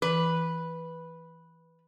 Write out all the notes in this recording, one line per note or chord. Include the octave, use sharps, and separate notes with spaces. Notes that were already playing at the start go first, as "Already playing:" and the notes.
E3 B4